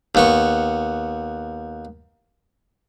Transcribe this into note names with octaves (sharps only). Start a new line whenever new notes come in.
D#2 B3 C#6